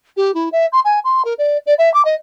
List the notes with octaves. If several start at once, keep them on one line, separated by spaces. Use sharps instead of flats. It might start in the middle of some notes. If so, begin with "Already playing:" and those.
G4
E4
E5
C6
G#5
C6
A#4
D5
D5
E5
D6
D#5